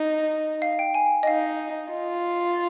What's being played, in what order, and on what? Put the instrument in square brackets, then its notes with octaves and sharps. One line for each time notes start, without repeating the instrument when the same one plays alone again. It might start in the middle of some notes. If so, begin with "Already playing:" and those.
Already playing: [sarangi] D#4
[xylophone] F5
G5
G#5
D#5
[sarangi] D#4 [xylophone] F5
[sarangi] F4